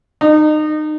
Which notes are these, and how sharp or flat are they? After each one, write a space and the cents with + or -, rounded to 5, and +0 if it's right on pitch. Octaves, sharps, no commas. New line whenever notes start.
D#4 -30